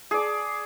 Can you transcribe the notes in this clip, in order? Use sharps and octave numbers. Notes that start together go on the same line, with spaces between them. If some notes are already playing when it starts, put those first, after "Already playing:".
G#4 D5 A5